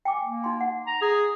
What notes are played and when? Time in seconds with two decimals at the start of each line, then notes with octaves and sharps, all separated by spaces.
0.05 G5 G#5 D6
0.22 A#3
0.44 D#4 C6
0.61 F#5
0.87 A#5
1.01 G#4